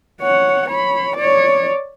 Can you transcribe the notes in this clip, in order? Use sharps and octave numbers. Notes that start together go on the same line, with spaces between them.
C#5 F#5
C#5 B5
C#5 D5